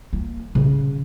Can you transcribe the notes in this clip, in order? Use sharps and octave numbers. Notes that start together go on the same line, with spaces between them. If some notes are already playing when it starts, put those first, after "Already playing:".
A#3
C#3